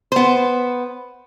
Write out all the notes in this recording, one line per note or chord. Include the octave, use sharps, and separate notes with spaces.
B3 C5